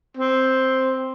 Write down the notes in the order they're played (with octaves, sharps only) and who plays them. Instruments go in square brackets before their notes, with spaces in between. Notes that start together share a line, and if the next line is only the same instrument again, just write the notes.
[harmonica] C4